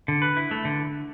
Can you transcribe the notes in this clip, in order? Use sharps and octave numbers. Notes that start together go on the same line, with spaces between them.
D3
B4
E4
A3
D3